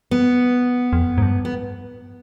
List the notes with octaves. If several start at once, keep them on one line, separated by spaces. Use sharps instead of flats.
B3
F2
G#2
G2
B3